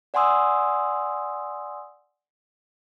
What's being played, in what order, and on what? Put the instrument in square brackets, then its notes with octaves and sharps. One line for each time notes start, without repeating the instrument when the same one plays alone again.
[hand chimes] D5 F#5 G#5 C6 D#6 E6